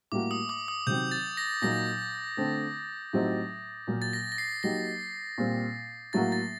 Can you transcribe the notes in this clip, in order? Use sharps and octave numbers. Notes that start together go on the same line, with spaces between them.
A2 G3 A#3 F#4 D6
D#6
D6
D#6
C3 D#3 F#3 C4 G6
A6
A#6
A#2 F#3 A#3 D#4 A#6
D3 A3 C4
A2 F#3 C4 D#4 G4
A#2 F#3 A#3
A6
A#6
A#6
C7
F#3 A#3 D#4 G4 A#6
A#2 G3 C4
A2 F#3 A#3 F#4 A6
A6